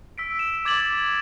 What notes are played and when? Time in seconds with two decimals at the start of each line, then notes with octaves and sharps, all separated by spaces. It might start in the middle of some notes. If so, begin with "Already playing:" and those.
0.18 E6 B6 D7
0.39 E7
0.65 D6 G#6 A6 F#7